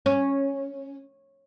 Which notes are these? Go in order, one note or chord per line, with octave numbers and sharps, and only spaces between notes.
C#4